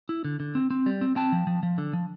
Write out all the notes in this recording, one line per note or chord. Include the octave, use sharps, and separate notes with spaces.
E4
D3
D3
C4
C4
G3
C4
C4 G5 A5
F3
F3
F3
D3
F3